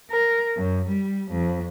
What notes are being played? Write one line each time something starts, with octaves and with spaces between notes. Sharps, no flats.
A#4
F#2
G3
F2